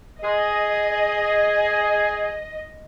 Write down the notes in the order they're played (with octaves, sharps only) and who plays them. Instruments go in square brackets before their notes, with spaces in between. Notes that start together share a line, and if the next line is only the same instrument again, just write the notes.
[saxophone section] G#4 [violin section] D#5